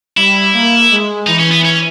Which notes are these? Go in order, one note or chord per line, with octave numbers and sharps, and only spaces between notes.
G3 E4
A#3
G#3
E3 D#4
C#4
B3
C#4